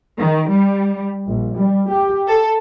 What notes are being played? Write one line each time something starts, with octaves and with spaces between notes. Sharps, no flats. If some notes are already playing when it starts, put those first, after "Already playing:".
D#3
G3
A#1
G3
G4
A4